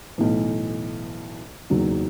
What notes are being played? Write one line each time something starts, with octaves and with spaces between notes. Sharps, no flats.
B1 A2 E3
F#1 E2 D#3 F#3